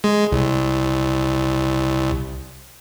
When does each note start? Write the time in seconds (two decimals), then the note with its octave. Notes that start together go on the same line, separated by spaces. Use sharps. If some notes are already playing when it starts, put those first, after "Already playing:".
0.04 G#3
0.32 C2